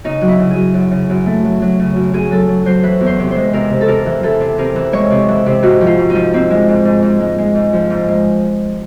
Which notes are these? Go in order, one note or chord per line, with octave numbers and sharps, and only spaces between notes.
C#3 D#4
F#3
E4
C#3
G#4
F#3
F#2
C#3
F#2
A3
F#3
F#3
C#3
F#2
F#2 G#4
F#3 A4
F#3
F#3 C5
E3 B4
E2
C5
C3
C5
G#3
C3 A#4
C3
A4
C3 A#4
E3
E3 A4
C3
C3 A#4
E3
G#3 C#5
C3
E3
C3
G#2 F#4
F3
F4
G#2
D#4
F3
G#2 C4
G#3
G#2
G#2
G#2
G#3
G#3
G#2
F3
G#2
G#3